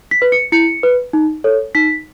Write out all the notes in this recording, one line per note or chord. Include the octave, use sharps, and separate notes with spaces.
B6
B4
C#7
E4 C#7
B4
D#4
A4 C#5
D#4 B6